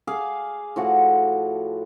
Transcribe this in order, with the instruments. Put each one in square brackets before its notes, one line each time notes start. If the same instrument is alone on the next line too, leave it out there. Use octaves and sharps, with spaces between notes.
[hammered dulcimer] G#4 F5 D6
A2 F3 F#4 F#5